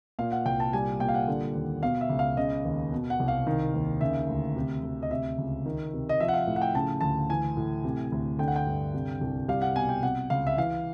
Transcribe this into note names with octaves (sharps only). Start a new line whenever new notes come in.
A#2 F5
F#5
C2 G5
A5
G3 G#5
A#2 G5
F5
F#5
D3
D#2
B2 F5
E5
C#2
F5
C#3 D#5
D#2
B2
F#5
C2
F5
D#3
D#2
C#3 E5
D2
C3
D2
D#5
C3 E5
C#2
D#3
C3
D#5
F3 E5
F#5
F5
A2
F#5
G5
C#3 A5
D2 A5
E3 G#5
A2
C3
D2
D3 G5
F#5
G5
G2
C3
C2
G3 F5
F#5
B2 G#5
G5
C3 F#5
C#2 F5
E5
E3 F5